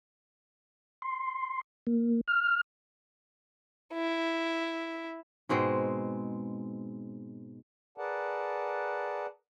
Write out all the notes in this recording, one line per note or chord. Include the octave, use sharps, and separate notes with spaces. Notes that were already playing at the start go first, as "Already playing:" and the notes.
C6
A#3
F6
E4
G#2 B2 G#3 C4
G#4 A#4 B4 D5 F#5 A5